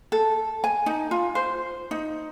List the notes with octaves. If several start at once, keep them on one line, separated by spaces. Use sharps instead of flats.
A4
G#5
D#4
F4
C5
D#4